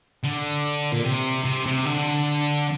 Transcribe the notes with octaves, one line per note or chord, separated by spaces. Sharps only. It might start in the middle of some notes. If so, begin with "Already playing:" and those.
D3
A#2
C3
C3
C3
D3